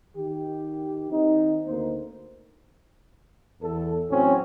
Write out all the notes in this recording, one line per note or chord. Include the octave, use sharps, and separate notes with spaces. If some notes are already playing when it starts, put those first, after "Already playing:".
D#3 G4
D#3 C4 D#4
D2 A#3 D#4 A#4 C5
E2 A4
A2 F#3 C4 C#4